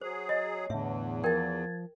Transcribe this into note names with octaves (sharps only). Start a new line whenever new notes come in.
F#3 G#4 C5
C#5 D#5
E2 A2 D3 E5
F3 A#4 G5 G#6 A6